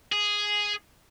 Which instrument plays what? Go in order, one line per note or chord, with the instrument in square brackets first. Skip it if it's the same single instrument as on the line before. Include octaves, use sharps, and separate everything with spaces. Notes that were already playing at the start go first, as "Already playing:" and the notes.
[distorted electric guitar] G#4